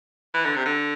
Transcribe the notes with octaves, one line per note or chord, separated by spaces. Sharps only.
E3
D3
C3
D3